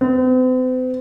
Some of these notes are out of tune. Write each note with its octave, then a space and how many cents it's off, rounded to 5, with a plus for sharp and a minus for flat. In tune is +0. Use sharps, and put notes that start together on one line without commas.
C4 -45